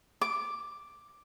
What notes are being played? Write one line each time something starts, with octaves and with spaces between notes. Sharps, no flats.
D6